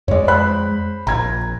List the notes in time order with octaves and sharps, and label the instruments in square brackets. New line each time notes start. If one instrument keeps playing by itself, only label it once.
[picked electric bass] F2 G#3 [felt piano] C#5 D5
[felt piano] C5 B5 F#6
[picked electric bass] A#1 A#2 [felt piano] A#5 G#6